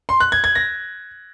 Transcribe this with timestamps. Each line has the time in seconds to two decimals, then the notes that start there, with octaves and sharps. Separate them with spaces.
0.09 C6
0.20 F#6
0.32 G#6
0.44 G#6
0.55 A#6